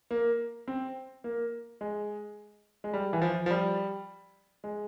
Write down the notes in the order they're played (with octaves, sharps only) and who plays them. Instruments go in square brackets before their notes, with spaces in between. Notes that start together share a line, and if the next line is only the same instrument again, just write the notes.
[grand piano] A#3
C4
A#3
G#3
G#3
G3
E3
F3
F3
G3
G#3